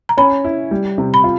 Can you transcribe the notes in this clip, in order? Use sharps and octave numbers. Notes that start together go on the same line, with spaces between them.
A#5
C#4 B5
E4
G3
C3
B5
F4